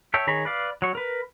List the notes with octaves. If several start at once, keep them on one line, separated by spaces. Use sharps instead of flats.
A4 C#5 E5 G5
D#3 G#4 C#5 A#5 B5
B4 D5 F5
F#3 C#6
A#4 B4